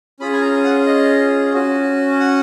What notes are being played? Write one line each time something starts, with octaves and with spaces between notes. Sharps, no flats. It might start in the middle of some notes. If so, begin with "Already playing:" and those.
C#4 F4 G#4 B5
G#5
A#5
F#5
D#5
C#4 F#4
F#5